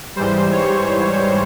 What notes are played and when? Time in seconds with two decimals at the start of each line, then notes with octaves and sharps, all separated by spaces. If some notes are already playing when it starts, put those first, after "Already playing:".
0.16 G#2 E3 G3 C5
0.52 C#5